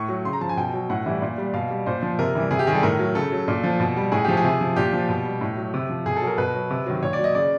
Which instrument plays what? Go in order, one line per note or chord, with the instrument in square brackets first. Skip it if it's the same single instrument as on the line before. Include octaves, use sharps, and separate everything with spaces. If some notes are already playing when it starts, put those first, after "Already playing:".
Already playing: [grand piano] A2 C#6
F#3
C#3 C6
A#5
F3 A5
G#5
B2 G5
F#3
A2 F#5
E3 G3
A#2
G3
B2 F5
G3
A#2 C5
F3
C3 A#4
E3 G3
C3 G#4
G4
D#3 G#4
G3 A4
A2 A#4
F#3
C#3 A4
F#3
A#2
F3
B2
G3
A2 G#4
F3 G4
G#4
C3
F3
A#2 G4
F3
B2
G3
A2
F#3
C3
F3
B2 G#4
A4
F#3
A#4
B2 B4
F#3
C3
D#3 F#3
A#2 C#5
D5
F#3
D#5
C#3 D5